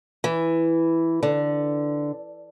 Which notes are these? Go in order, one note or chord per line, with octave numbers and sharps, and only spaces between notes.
E3
D3